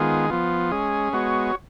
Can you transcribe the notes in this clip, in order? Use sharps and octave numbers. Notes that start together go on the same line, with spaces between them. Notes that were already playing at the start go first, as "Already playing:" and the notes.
Already playing: D#3 G#3 B3 F4 G#4
F3 B3 F4
G#3 C#4 G#4
G#3 B3 F#4 C#5